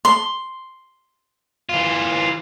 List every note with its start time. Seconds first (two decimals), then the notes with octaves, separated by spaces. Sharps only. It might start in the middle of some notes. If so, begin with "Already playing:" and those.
0.05 C6
1.69 E3 F4